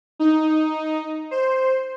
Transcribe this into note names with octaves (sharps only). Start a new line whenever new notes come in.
D#4
C5